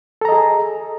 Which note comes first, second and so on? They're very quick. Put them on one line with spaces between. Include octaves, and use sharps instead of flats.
A4 A#5 D#5 G#4